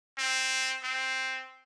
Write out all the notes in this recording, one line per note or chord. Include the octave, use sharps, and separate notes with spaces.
C4
C4